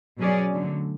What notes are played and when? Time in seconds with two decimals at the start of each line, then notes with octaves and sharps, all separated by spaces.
0.18 B2 F#3 C#4 G#4 D5
0.53 D3 F#3 A3